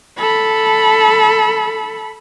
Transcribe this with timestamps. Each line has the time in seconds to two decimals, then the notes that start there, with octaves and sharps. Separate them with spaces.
0.19 A4 B5